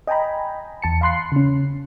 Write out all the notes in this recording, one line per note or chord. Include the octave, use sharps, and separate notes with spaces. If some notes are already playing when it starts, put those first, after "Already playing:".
D#5 G5 G#5 A#5 B5
E2 A5 C#7
F5 B5 C6 F#6 C7
C#3 C#4